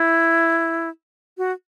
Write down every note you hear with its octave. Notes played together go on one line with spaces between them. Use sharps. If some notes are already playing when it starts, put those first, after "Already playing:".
Already playing: E4
F#4